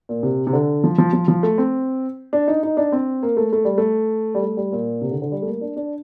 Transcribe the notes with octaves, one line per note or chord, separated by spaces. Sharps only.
A#2
C3
C3
D3
F3
F3
F3
F3
A3
C4
D4
D#4
D#4
D4
C4
A#3
A3
A3
G3
A3
G3
A3
G3
A#2
C3
D3
D3
G3
A3
A#3
D4
D4